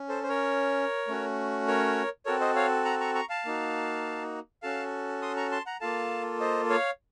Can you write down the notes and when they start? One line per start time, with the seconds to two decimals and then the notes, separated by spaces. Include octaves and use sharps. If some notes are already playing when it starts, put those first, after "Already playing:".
Already playing: C#4
0.09 A4 C5
0.23 C5
0.29 A#4 C#5
1.08 A3 C#4 F#4
1.68 A#4 C#5
2.26 C4 F#4 A4 A#4 C#5
2.40 C5 D#5
2.56 C#5 F5
2.85 F#5 A#5
3.00 A#5 C#6
3.15 A#5 C#6
3.29 F5 A5
3.45 A#3 D#4 F#4
4.62 C#4 F#4 A4 F5 A5
5.22 C6 D#6
5.36 A#5 C#6
5.52 A5 C6
5.66 F#5 A#5
5.81 A#3 F4 A4 F5 A5
6.40 C5 D#5
6.70 C#5 F5